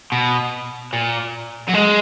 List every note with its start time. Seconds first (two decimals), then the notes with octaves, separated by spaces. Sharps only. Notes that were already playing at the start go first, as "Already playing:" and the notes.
0.12 B2
0.93 A#2
1.69 F#3
1.74 G#3